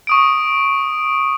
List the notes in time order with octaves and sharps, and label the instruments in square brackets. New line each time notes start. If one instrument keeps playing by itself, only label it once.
[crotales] C#6 D#6 D7